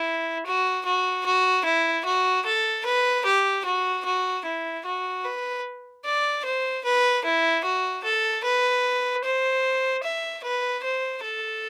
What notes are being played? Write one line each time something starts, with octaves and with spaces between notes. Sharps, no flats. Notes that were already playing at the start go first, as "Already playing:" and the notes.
Already playing: E4
F#4
F#4
F#4
E4
F#4
A4
B4
G4
F#4
F#4
E4
F#4
B4
D5
C5
B4
E4
F#4
A4
B4
C5
E5
B4
C5
A4